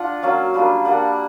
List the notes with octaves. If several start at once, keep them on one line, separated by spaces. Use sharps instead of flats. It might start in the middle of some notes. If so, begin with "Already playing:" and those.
Already playing: D4 F4 F#5
F#3 A#3 C#4 F5
G3 A#3 D4 F4
G3 A#3 D4 F#5